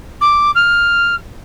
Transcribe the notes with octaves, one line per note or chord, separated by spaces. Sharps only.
D6
F6